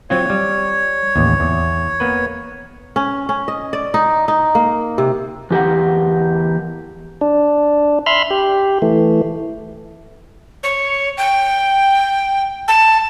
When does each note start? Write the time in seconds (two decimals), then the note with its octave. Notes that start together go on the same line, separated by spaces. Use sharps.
0.10 F#3 C4 F4 C#5
0.30 G3
1.16 A1 D#2
1.40 E2
2.00 A#3 B3 B4
2.96 C#4
3.29 C#4
3.48 D#5
3.73 D5
3.94 D#4
4.28 D#4
4.55 A#3
4.98 C3
5.51 E2 G4 A#4 F#5
7.21 D4
8.06 E5 B5 C6 F6
8.31 G4
8.82 E3 A3
10.63 C#5
11.17 G5
12.68 A5